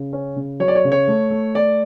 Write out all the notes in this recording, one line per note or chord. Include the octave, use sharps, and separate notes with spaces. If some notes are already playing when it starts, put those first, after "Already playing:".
Already playing: C#3
C#4
C#3
F#3 C#5
D5
C#5
C#3
C#5
A3
A3
A3 D5